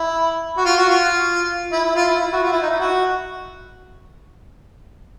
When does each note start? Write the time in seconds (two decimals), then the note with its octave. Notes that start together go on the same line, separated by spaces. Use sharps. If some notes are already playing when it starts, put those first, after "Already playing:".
Already playing: E4
0.57 F#4
0.65 F4
0.77 F#4
0.89 F4
1.72 E4
1.83 E4
1.95 F4
2.08 E4
2.20 E4
2.32 F#4
2.43 F4
2.52 E4
2.62 D#4
2.71 E4
2.80 F#4